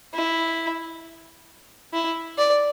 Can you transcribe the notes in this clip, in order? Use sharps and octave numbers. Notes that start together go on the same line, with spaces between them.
E4
E4
D5